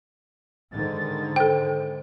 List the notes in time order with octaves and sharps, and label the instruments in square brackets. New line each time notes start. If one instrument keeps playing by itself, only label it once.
[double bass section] G#2 D3 D#3 [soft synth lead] A6
[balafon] A4 G5 [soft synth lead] C5